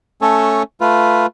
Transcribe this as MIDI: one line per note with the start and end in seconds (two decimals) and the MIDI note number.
0.22 0.63 57
0.22 0.63 61
0.22 0.63 69
0.22 0.63 73
0.81 1.26 57
0.81 1.26 65
0.81 1.26 71